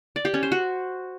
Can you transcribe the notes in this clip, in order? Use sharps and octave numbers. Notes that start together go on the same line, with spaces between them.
D5
G4
C#4
C5
F#4